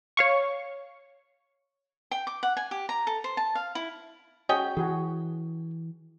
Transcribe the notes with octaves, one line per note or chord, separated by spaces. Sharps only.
C#5 F5 C#6
G5
D6
F#5
G#5
G4
A#5
A4
C5
A5
F5
E4
C#4 F#4 G#4 D#5 G5
E3 F#4 G#4